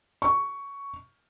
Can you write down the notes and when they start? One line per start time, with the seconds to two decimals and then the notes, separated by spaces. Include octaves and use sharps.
0.22 C#6